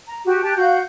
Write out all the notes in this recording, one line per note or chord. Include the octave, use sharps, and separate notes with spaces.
A#5
F#4 G4
G4 A5 F#6
F#4 F5 G6